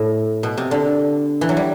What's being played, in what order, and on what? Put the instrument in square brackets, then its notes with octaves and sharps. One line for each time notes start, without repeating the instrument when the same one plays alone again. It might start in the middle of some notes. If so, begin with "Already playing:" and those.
Already playing: [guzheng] A2
B2
C3
D3
E3
F#3
G3